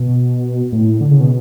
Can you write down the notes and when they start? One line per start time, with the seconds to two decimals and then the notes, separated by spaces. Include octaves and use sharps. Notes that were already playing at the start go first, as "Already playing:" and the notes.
Already playing: B2
0.72 A2
1.01 D3
1.10 C#3
1.21 B2